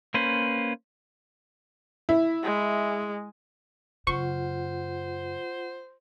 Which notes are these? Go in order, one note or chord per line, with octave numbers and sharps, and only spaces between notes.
A#3 C#4 B4 C5
E4
G#3
F#2 C#3 F4 C5 F#5 C#6